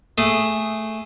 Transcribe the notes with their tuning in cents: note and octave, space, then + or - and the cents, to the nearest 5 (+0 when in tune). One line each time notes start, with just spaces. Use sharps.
A3 +0 G#4 +0